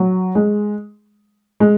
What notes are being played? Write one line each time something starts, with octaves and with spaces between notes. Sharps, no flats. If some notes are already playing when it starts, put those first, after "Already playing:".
Already playing: F#3
G#3
G#3